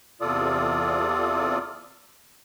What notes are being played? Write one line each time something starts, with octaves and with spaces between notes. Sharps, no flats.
E2 C3 F4 A4 D5 D#6